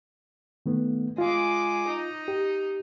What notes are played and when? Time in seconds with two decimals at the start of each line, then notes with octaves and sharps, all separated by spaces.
0.66 D#3 A3 B3
1.18 G#3 F4 D6
1.89 D#4
2.28 G4